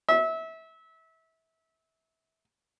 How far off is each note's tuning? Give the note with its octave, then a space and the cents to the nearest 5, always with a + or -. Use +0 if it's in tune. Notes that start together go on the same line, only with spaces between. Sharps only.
E5 -25